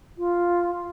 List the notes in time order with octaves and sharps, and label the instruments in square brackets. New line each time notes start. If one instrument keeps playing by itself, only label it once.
[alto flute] F4